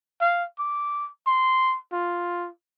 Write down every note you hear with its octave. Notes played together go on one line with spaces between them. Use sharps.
F5
D6
C6
F4